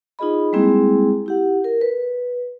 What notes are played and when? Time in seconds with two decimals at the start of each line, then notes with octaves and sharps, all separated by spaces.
0.19 D#4 F4 G#4 D#5 B5
0.53 G3 G#3 A#3 C4 E4 G#4
1.26 E4 G4 F#5
1.64 A#4
1.81 B4